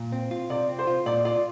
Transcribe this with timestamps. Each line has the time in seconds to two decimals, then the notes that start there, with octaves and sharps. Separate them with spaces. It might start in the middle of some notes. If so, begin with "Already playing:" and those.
Already playing: A#2
0.12 C4
0.31 F4
0.49 C3 D5
0.69 C4
0.79 C5
0.87 F4
1.06 A#2 D5
1.25 F4 D5